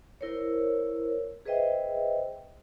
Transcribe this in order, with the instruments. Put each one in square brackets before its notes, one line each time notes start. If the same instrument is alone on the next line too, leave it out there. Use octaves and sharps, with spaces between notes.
[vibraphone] E4 A#4 C5 C#5
G#4 B4 C5 D#5 E5 G5